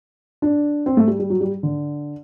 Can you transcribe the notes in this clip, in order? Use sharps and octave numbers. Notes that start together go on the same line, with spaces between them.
D4
C4
A3
G3
G3
F#3
G3
D3